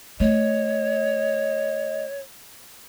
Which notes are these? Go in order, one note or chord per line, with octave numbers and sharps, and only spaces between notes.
A3 C#5 D#5